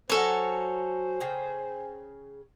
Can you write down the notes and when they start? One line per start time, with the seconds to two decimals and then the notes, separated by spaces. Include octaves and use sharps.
0.10 F#3 F#4 A4 A#4 C5 C#5 G#5
1.20 C#3 G#4 G5